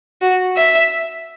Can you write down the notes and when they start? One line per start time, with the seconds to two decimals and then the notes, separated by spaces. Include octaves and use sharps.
0.21 F#4
0.57 E5